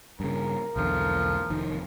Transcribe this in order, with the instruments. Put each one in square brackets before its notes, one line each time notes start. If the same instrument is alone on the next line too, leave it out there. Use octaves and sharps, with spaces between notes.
[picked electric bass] G2 C#3 [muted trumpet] A#4
[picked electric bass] B1 E2 D3 [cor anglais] F3
[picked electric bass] F1 D#3